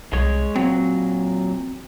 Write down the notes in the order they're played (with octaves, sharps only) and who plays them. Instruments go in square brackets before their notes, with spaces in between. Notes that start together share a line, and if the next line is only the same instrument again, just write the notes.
[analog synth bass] C2 [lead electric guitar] G#3 C#5
[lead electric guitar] A#2 F#3 [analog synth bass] C4